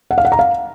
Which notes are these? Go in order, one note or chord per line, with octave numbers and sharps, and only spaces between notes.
F#5
F5
F#5
A#5
F5